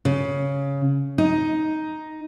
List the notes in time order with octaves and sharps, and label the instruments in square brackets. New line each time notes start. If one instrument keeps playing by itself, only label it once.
[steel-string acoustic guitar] C#3
D#4